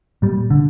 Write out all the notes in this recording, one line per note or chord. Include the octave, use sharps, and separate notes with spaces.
A#2 G3
D3